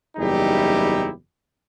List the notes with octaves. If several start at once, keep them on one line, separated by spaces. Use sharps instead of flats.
F#1 E2 G3 D#4 E4 G4